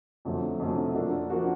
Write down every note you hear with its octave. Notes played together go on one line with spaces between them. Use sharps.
F2 D3 F#3 A3
F2 D3 F#3 A3
F3 A#3 D4 F#4
F3 A#3 D4 F#4